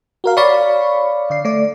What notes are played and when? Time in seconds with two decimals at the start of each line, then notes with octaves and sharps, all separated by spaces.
0.24 F#4 A#4 F5
0.37 C#5 D5 F5 B5 C#6
1.30 D3 D5 C7
1.45 A3 D5